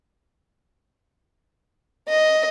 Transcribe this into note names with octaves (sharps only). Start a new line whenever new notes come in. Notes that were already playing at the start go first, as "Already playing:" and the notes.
D#5